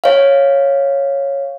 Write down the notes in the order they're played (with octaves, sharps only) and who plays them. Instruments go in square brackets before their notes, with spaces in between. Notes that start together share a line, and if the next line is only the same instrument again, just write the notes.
[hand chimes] C#5 F5